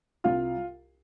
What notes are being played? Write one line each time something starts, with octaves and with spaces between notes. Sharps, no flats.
C2 F4 F5